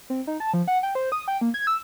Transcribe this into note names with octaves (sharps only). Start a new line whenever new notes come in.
C4
D#4
A5
F3
F#5
G5
C5
D#6
G5
A#3
G#6
E6